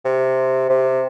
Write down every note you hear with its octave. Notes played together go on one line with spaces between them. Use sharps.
C3
C3